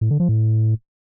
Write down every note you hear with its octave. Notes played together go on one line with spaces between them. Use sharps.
A2
D3
F3
A2